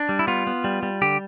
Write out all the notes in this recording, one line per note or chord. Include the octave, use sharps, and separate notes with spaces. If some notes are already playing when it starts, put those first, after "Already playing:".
Already playing: D4
G3
E4
B3 F4
B3
G3
G3
D3 G4